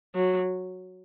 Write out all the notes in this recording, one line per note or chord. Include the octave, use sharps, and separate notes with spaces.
F#3